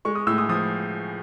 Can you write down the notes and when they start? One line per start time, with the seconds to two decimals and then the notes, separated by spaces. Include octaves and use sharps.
0.05 G#3 C#6
0.15 D#6
0.27 A2 E6
0.38 D#6
0.49 F3 D#6